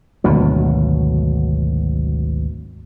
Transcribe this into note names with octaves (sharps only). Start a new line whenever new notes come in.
G#1 D2 B2 F#3